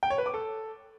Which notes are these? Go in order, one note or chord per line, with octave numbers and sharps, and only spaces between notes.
G5
C#5
B4
D6
A4